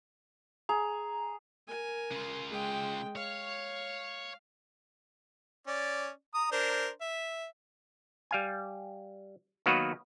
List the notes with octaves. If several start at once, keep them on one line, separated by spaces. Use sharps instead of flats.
G#4 A#5
A#4 G#5
C#3 F4
G#3 G5
C#5 F5
C#4 D5
A#5 D#6
D4 A#4 C5
E5
G3 F5 G#5
D#3 F#3 A#3 B3 F#4 B4